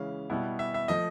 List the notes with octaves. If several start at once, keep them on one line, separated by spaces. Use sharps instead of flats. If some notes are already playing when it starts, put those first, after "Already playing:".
Already playing: C#3 E3 G#3 C#4 F5
B2 G3 B3 E4
E5
E5
F3 A3 D#5